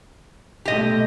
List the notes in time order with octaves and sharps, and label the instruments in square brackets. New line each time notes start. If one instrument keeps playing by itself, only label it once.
[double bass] B2 A3 [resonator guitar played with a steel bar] G4 D#5